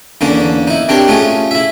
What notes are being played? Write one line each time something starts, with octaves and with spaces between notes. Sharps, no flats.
E2 D3 A#3 C#4
D#4 E4
C4 D4 G4 A#4 C#5
A3 C#4 F4 G#4
E4 E5